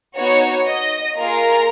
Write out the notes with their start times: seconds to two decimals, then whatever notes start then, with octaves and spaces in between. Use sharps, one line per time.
0.15 B3 D#4 F#4 C#5
0.67 D#5
1.18 A#3 F4 G#4 A#4 A#5